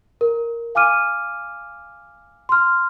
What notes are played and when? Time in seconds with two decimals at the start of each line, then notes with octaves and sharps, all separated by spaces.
0.21 A#4
0.75 F5 G#5 D6 F6 D#7
2.49 C6 F6